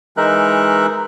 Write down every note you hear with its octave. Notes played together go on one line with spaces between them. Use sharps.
E3 G#3 D#4 A#4 E5 F#6